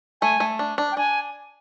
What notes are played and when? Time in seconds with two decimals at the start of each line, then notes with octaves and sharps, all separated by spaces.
0.21 A3 G#5
0.40 A3
0.59 D4
0.78 D4
0.92 G5
0.97 D4 G#5